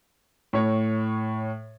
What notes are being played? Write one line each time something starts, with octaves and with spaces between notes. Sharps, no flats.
A2 C#5